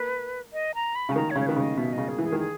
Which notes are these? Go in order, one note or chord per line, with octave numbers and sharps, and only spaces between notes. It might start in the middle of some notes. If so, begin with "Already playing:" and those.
Already playing: A#3 B4
D#5
A#5
B5
C#3
G#5
D#3 A#5
C#5
C#3
C#5
D#3 B4
C#3 D#5
B2 E5
C#3 D#5
G#4
E3
G#4
D#3
G#4